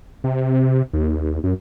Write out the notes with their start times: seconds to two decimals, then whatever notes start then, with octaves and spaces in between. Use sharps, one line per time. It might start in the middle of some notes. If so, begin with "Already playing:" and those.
0.24 C3
0.93 D#2
1.44 F#2